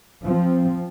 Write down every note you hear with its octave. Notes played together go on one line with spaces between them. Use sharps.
F3 C4